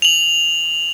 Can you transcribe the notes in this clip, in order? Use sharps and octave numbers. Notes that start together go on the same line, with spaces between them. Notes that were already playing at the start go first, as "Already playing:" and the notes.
F7 F#7